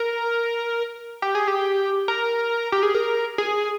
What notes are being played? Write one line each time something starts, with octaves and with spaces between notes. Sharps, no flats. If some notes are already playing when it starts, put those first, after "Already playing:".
Already playing: A#4
G4
G#4
G4
A#4
G4
G#4
A#4
G#4